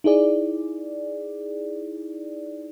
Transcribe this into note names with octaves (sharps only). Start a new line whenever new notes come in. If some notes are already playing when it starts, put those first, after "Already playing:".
D#4 E4 G#4 D5